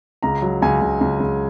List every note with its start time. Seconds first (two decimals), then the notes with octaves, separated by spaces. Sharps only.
0.23 C#2 A#5
0.42 F#3
0.62 C#2 G#5
0.81 C#2
1.01 C#2
1.20 C#2